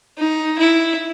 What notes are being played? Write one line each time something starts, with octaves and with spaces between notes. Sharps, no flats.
D#4
E4